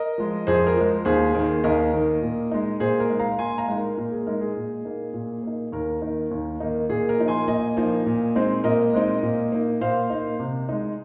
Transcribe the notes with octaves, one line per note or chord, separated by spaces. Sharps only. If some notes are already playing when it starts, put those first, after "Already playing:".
Already playing: A#4 D#5
F3 G#3
F2 G#4 C5
A#4
F3 G#3
D#2 G#4 C5
D#3 A#3
D#2 A#4 D#5
D#3 A#3
A#2
G#3 D#4
A#2 G#4 C5
A#4
G#3 D#4
F5 A#5
A#2 G#5 C6
F5 A#5
G#3 D#4
A#4
A#2 A#4
G#4
G#3 D#4 A#4
G#4
A#2
A#3 D#4
A#2
A#3 D#4
D#2 A#4
D#3 A#3 D#4
D#2
D#3 A#3 D#4
A#2 G#4
A#4
F3 A#3 D#4
G#5 C6
A#2 D#5 G#5
F3 A#3 D#4
A#2
G#3 C4 D#4
A#2 A#4 D#5
G#3 C4 D#4
A#2
A#3 D#4
A#2 C5 F5
A#3 D#4
C3
G#3 D#4